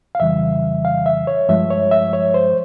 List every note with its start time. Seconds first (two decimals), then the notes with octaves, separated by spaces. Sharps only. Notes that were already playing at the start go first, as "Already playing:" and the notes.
0.15 F5
0.20 F2 C#3 E3 G3 E5
0.85 F5
1.06 E5
1.27 C#5
1.49 G2 F3 G#3 E5
1.70 C#5
1.91 E5
2.13 C#5
2.34 C5